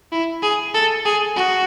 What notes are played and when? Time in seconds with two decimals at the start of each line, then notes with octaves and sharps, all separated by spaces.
0.12 E4
0.43 G#4
0.74 A4
1.05 G#4
1.36 F#4